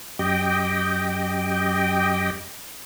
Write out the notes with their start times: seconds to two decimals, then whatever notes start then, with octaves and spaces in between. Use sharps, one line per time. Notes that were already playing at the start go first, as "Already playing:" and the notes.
0.19 F#2 G4 D#5 G5